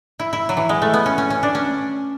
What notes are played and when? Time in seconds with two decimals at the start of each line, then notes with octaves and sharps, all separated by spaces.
0.19 E4
0.33 E4
0.49 F#3
0.57 E3
0.69 G#3
0.82 A3
0.94 B3
1.06 C#4
1.18 C#4
1.30 C#4
1.43 D4
1.55 C#4